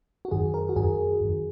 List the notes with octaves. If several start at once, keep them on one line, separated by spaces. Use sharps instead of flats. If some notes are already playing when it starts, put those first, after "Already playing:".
F#4
F#2 D#3 G#4
A#4
F#4
F#2 D#3 G#4
F#2 D#3